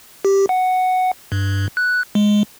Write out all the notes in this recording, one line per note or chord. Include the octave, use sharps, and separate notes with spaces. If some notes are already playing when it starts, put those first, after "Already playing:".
G4
F#5
G2
F#6
G#3